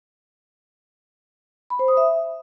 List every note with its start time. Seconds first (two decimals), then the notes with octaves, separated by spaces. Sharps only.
1.70 B5
1.79 C5
1.88 D#6
1.97 E5